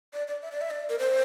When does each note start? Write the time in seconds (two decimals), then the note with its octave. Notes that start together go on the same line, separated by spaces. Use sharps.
0.13 D5
0.27 D5
0.42 E5
0.51 D5
0.61 E5
0.70 D5
0.89 A#4
0.99 C5